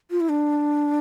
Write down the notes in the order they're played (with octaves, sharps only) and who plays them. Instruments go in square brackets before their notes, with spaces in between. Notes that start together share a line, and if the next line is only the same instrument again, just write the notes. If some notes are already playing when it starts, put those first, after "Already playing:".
[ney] F4
E4
D4